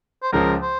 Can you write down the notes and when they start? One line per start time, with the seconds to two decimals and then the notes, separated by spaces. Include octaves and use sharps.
0.23 C5
0.32 C#2 C#3 F3 A#4
0.62 C5